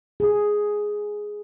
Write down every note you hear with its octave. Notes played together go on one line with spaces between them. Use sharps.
G#4